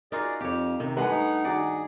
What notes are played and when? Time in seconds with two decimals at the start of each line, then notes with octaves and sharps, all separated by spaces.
0.12 D#4 F4 F#4 G#4 A#4 D5
0.41 F2 G4 C#5
0.80 C3 D#3
0.97 G2 E3 G#3 A3 B4 F#5 G#5
1.11 D#4
1.45 D#3 F#4 G#4 D5 A#5